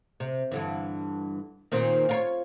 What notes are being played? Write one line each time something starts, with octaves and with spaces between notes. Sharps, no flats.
C3
G2 D3 E3
A#2 D#3 C4
F4 A#4 C#5